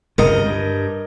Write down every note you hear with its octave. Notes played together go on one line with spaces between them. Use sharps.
G1 C#2 C3 A#4 D#5
G2